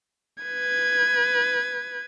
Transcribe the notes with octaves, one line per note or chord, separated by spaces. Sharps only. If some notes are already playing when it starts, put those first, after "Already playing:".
B4 G#6